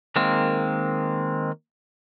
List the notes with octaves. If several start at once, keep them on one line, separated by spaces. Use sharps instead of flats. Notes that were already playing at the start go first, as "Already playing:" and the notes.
D#3 G#3 A#3 C4